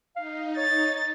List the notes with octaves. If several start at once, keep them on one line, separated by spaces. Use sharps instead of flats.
D#4 F5
C#5 A6